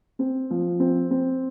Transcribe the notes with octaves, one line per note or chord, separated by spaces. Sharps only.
C4
F3
C4
C4